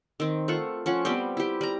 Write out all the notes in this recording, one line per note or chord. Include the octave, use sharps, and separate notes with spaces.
D#3 C4
A3 F4 F#5
F3 C#4 F#5
G3 B3 C4 G4
E4 G4
G3 A#5